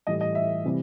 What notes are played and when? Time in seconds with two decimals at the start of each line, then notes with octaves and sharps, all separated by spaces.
0.07 A2 E3 G3 D#5
0.21 D#5
0.35 E5
0.65 C3 E3 G3